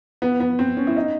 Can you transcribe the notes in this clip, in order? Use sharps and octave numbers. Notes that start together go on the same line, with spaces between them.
B3
B3
C4
C#4
E4
D#4